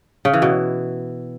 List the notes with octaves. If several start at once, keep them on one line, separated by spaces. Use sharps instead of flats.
C#3
E3
B2